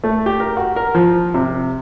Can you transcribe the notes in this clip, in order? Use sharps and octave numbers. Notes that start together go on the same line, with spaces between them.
A3
G4
A#4
F#4
A#4
F3
C3